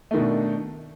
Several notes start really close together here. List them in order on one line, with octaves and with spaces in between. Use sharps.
A3 D#3 B2 D4